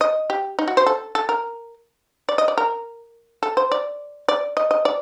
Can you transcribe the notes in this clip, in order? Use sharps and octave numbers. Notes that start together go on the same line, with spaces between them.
D#5
G4
D#4
F#4
C5
A4
A4
A#4
D5
D#5
D5
A#4
A4
C5
D5
D5
D#5
D#5
D5